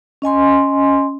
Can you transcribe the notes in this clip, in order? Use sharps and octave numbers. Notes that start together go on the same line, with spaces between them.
C#4 D#5 G#5 C6